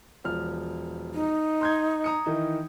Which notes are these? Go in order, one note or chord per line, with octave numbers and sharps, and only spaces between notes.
E1 F3 F6
D#4
C6 G6 G#6
A#5 D#6 C#7
D#3 E3 D#4